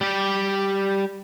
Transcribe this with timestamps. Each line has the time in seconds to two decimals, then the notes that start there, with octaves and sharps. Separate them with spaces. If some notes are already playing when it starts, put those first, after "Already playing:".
0.01 G3 G4